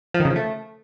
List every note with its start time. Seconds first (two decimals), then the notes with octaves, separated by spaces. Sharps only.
0.14 F3
0.20 D#3
0.25 C#3
0.30 F3
0.36 A3